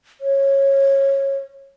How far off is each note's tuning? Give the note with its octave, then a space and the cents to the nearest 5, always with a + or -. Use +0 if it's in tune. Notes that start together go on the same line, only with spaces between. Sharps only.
C#5 -15